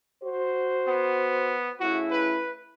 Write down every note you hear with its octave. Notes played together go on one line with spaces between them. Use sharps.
F#4 C5
B3
C#3 A3 E4 F#4
B4